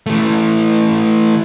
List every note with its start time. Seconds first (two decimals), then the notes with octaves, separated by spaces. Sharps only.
0.06 E3 A3